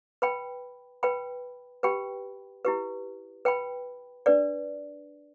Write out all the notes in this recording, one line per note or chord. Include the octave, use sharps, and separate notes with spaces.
B4 G5 B5
B4 G5 B5
G4 B4 G5 B5
E4 G4 B4
B4 G5 B5
D4 B4 D5